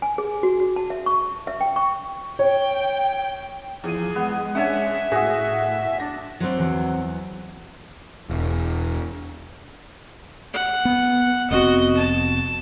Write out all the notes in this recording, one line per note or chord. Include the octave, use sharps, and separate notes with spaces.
G#5
G#4
F#4
F#4
A5
E5
C#6
E5
G5
C#6
C#5 G5
E2 F3 G#4 D#7
G#3 B3
C#4 D4 C#5 E5 F#5 G#5
A2 F#4 G#4 G#5 D#6
D4 A#6
F#3 C4 F#4 C5 D5
E2 E3 B3
E1
F#5
B3
F1 B3 C4 F#4 D#5
A5